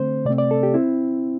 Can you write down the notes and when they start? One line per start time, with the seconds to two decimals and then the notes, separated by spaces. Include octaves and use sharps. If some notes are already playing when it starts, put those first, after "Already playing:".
Already playing: D3 A3 C4 C5
0.25 C3 A3 C4 D5
0.38 D5
0.51 A4
0.63 G4
0.74 C4 E4